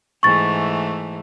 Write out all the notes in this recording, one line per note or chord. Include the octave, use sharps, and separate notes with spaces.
G#2 E3 A3 C#6 A6